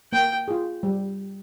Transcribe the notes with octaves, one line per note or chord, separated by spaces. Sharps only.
A#3 G5
F4 G#4
G3